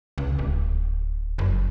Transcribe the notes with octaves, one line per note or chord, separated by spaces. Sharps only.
C#2
D1
F#1